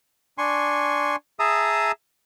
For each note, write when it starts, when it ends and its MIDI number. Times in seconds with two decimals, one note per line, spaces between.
0.38 1.16 62
0.38 1.16 80
0.38 1.16 84
0.38 1.16 85
1.39 1.92 68
1.39 1.92 76
1.39 1.92 81
1.39 1.92 82
1.39 1.92 87